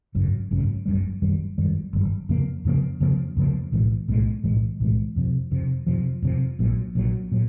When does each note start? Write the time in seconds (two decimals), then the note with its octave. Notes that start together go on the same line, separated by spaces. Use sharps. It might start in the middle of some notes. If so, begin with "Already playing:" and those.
0.15 G#1 F#2 C#3
0.51 G#1 F#2 C#3
0.86 G1 F#2 D#3 G3
1.22 G1 F#2 D#3 G3
1.58 G1 F#2 D#3 G3
1.93 G1 F#2 D#3 G3
2.29 F2 C#3 F3 A#3
2.65 F2 C#3 F3 A#3
3.00 F2 C#3 F3 A#3
3.37 F2 C#3 F3 A#3
3.72 B1 A2 E3 G#3
4.08 B1 A2 E3 G#3
4.44 B1 A2 E3 G#3
4.80 B1 A2 E3 G#3
5.16 F2 C3 F3
5.51 F2 C3 F3
5.87 F2 C3 F3
6.22 F2 C3 F3
6.59 A#1 A#2 F#3
6.95 A#1 A#2 F#3
7.32 A#2 F#3